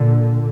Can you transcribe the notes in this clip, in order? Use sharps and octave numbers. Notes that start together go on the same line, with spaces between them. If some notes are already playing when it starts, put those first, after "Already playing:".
Already playing: A#2 D3